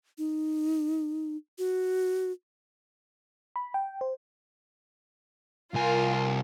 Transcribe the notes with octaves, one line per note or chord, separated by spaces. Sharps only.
D#4
F#4
B5
G5
C5
C2 F4 A#4 G#5